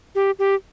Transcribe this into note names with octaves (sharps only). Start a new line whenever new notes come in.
G4
G4